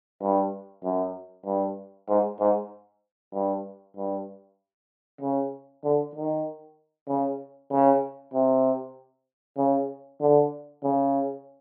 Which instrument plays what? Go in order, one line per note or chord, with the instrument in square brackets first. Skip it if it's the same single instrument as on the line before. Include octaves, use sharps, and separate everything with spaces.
[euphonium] G2
F#2
G2
G#2
G#2
G2
G2
C#3
D3
D#3
C#3
C#3
C3
C#3
D3
C#3